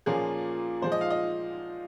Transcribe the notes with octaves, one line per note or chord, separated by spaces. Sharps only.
A#2 F3 A#3 C#4 G#4
A#2 F3 G#3 C5
D#5
F5
D#5